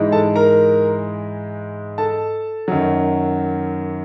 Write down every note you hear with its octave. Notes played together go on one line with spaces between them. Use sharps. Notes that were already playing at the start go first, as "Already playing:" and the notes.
Already playing: G#2 E3 G#3
A4 A5
A#4 A#5
A4 A5
F#2 D#3 F#3